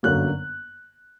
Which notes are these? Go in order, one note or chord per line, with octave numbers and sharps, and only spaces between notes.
G1 F#2 D3 F#3 A#3 F#6